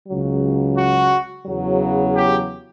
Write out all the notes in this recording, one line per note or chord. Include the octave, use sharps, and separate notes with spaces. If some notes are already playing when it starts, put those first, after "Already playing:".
C#2 C#3 F#3
F#4
E2 C#3 F#3
G4